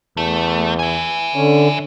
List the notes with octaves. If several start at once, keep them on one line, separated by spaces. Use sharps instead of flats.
E2 A3
E5 G#5
D3 C#4